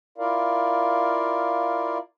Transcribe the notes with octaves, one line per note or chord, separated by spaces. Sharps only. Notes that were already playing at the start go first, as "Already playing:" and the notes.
E4 F4 A#4 D5 F5